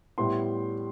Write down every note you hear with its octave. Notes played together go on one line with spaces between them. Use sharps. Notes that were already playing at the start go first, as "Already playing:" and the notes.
A2 G3 B3 E4 C6